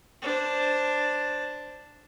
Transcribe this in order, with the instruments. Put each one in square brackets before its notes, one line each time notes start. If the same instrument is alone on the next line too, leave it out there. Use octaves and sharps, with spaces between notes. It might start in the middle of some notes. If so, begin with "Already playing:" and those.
[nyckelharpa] D4 C5